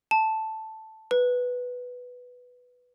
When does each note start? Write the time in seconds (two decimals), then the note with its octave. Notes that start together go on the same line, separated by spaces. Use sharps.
0.11 A5
1.11 B4